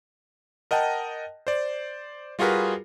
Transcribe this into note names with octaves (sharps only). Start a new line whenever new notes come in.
A#4 D#5 F#5 G5 A5
C5 D5
G3 F4 F#4 G#4 A#4 B4